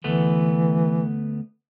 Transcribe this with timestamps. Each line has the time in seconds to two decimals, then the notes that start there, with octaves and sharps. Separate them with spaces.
0.04 D2 E3 A3 B3